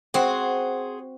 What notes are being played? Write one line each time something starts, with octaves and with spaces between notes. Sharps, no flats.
C4 F#4 G#4 C5 F#5